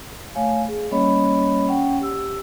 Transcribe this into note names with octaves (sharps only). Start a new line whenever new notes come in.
A3 C#5 F5 G#5
G#4
G3 A#3 C#4 C#5 D#5 B5
C#4 F#5 G5
G4 E6